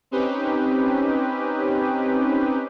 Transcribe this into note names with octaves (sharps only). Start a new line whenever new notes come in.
C4 C#4 D#4 G4 B4